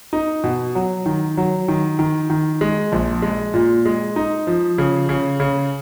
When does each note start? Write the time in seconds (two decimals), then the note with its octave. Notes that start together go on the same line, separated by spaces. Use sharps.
0.13 D#4
0.44 B2
0.75 F#3
1.06 D#3
1.37 F#3
1.68 D#3
1.99 D#3
2.30 D#3
2.61 G#3
2.92 A#1
3.22 G#3
3.54 A#2
3.86 G#3
4.16 D#4
4.47 F3
4.78 C#3
5.09 C#3
5.40 C#3